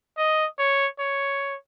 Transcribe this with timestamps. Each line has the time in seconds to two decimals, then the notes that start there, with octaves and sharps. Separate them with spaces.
0.18 D#5
0.59 C#5
0.99 C#5